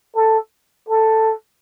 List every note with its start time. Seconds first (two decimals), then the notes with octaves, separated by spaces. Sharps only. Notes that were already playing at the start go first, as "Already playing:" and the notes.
0.16 A4
0.88 A4